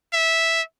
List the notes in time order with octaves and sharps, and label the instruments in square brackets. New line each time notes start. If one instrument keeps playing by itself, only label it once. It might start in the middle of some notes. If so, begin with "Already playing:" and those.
[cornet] E5